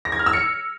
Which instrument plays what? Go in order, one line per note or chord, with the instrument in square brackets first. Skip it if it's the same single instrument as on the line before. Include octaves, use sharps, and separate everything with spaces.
[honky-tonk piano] A#6
G#6
F6
E6
C#7